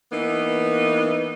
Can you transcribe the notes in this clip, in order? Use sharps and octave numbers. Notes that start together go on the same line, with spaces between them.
E3 A#3 B3 D#4